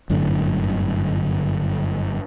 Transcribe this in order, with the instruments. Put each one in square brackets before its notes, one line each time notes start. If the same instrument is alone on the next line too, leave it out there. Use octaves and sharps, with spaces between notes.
[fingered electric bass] G1 F#2 A2 D3